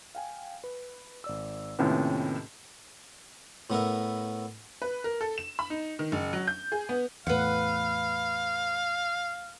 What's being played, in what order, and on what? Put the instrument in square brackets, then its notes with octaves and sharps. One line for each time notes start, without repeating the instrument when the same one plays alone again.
[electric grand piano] F5 G5 G#5
B4
G#1 D5 E6
[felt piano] D#2 A2 C3 [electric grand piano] C#4 F4 B4
[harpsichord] A2 B3 A#4 E5
[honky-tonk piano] B4
A#4
A4
E7
B5
D#4
D#3
F#1
F#3
G6
G#4
B3
[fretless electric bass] E2 A2 [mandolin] B4 F#5 [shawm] F5